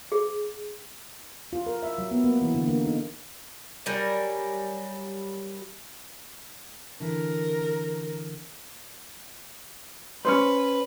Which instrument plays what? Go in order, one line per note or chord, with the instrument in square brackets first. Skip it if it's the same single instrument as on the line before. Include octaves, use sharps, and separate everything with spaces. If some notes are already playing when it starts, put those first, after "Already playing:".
[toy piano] G#4
[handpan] F4
A#4
E5
F#3
B3
A#3
E3
D3
A#3
D#4
[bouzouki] F#3 G3 A#4 G#5
[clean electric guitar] D3 E3 [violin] A#4
[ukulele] C#4 D#4 C5 [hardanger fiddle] B4